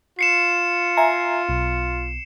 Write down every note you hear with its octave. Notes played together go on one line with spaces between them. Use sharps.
F4 C7 C#7 E7
E5 G#5 A#5
B1